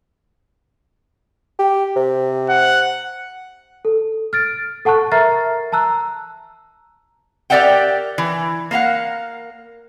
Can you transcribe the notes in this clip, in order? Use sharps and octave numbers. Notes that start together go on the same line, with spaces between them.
G4
C3
F#5
A4
F6 A6 D7
A4 F#5 A5 C#6 F#6
A#4 E5 A#5 F6 A6 C7
A5 A#5 E6 F#6
G4 A#4 D5 E5 F#5 G5
E3
A#3 A#4 F5 F#5